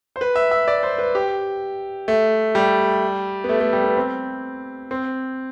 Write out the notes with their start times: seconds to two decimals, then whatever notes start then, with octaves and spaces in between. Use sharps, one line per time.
0.16 C5
0.21 B4
0.36 E5
0.51 E5
0.68 D5
0.83 C5
0.98 B4
1.15 G4
2.08 A3
2.55 G3
3.44 B3
3.49 A3
3.61 A3
3.73 G3
3.84 B3
3.97 C4
4.91 C4